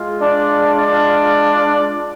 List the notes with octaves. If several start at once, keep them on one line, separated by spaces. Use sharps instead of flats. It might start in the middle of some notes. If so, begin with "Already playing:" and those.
Already playing: G#3 F4
D4 D5
D4 D5